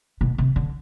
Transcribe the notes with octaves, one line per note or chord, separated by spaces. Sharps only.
B2
C3
D3